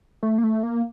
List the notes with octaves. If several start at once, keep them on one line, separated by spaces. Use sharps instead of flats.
A3
A#3
A3
A#3